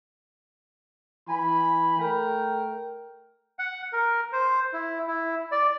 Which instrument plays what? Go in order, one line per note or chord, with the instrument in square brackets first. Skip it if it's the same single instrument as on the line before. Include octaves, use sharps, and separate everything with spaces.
[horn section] E3 G#5 B5
A3 A#4 G5
[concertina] F#5
A#4
C5
E4
E4
D5